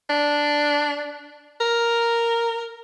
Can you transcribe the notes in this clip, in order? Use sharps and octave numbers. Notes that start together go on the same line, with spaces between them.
D4
A#4